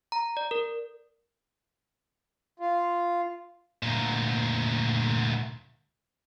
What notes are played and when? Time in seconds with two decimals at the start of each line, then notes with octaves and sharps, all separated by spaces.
0.12 A#5
0.37 D5
0.51 A#4
2.60 F4
3.83 D2 A#2